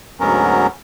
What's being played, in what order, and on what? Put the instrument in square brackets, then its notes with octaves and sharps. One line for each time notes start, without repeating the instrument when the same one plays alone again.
[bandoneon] D2 G#2 F#3 B3 C#4 A#4